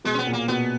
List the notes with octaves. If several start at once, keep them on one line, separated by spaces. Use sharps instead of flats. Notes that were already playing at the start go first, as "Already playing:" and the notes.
B2 G#3
C#4
B3
A#2
A#3
B2 B3